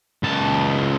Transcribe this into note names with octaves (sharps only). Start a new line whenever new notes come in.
C#2 A5